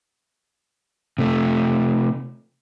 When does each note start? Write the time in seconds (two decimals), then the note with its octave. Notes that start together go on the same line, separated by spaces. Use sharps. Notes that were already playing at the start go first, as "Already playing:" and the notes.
1.19 C3 A3